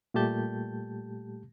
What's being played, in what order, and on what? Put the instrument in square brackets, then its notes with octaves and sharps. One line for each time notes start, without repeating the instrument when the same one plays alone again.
[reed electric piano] A#2 G3 A3 G4 A5 G6